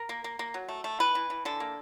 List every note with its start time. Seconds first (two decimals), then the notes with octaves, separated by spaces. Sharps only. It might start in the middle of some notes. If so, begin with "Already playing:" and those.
Already playing: A#4
0.09 A#3
0.24 A#3
0.39 A#3
0.54 F#3
0.69 A3
0.84 A3
1.00 E3 B4
1.15 E3
1.30 E3
1.45 D3 A4
1.60 A#3